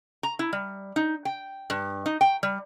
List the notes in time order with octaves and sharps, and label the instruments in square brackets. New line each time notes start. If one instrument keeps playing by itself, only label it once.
[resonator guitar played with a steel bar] A#5
E4
G3
D#4
G5
G2
D#4
G5
G3